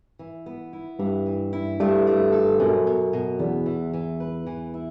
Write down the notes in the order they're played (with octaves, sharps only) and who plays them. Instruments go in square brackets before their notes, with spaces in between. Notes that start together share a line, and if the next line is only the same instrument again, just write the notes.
[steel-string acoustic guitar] E3
B3
E4
[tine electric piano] G2 [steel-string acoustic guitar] E3
[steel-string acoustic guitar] E3
E4
[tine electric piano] G2 [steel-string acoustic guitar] A3
[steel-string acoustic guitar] A3
A4
[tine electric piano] F#2 [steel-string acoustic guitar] B2
[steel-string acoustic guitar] B2
B2
[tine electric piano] E2 [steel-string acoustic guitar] B3
[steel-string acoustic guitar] E3
E3
B4
E3
E4